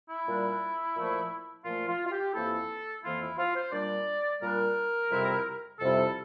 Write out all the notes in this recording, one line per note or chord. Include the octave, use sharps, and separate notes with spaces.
E4
A#2 G3 D4
A#2 F3 A3
A#2 F3 A3 F4
F4
F4
G4
F2 E3 A#3 E4 A4
F2 E3 A#3 E4 F4
E4
F4
C5
A#2 G3 D4 D5
A#2 G3 D4 A#4
F2 C3 G3 C4 E4
F2 C3 G3 C4 E4 A4